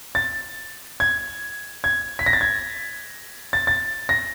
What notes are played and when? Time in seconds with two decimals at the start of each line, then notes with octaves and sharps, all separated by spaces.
0.15 A6
1.00 G#6
1.84 G#6
2.19 B6
2.26 A#6
2.33 A6
2.41 G#6
3.53 A6
3.67 A6
4.09 A#6